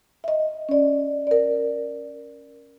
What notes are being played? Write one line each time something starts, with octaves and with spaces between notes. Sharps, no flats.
D#5 E5
C#4 D5
A#4 D5